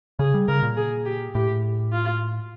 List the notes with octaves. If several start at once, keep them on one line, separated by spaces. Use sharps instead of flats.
C#3 G#4
G3
C#3 A#4
A#2
G#4
G4
A2 G4
F4